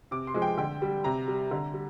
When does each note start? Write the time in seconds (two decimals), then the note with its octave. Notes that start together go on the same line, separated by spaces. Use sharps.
0.11 C3 D6
0.27 C6
0.34 F3 G#3
0.42 G5
0.57 D3 G5
0.82 G3
1.04 C3 A#5
1.28 G3
1.51 D3
1.74 G3